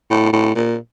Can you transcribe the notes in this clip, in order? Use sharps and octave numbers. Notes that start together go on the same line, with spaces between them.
A2
A2
A#2